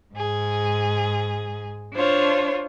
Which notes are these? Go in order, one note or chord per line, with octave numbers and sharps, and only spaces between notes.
G#2 G#4
D4 F4 C5 C#5